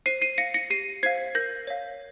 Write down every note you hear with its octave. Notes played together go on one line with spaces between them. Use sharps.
C5 C7 D#7
C7 D#7
F5 A#6 C#7
A#6 C#7
G4 C7 D#7
C5 F5 G#6 C7
A#4 G6 A#6
C#5 F5